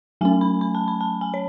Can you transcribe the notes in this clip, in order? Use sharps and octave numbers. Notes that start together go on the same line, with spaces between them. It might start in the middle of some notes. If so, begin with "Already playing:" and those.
F#3 A3 C#4 G#5
B5
B5
A5
B5
A5
G#5
C#5